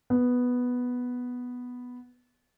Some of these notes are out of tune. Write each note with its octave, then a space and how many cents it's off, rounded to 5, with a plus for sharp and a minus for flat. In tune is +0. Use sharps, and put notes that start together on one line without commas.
B3 +0